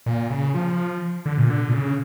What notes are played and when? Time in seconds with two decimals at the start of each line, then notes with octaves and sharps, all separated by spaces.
0.06 A#2
0.30 C#3
0.54 F3
1.26 D3
1.38 A#2
1.50 D3
1.69 A#2
1.73 C#3